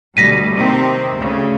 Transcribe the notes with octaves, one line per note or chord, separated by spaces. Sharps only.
D2 B2 G3 A#6 B6 D#7
C3 D#3 C4
D2 C#3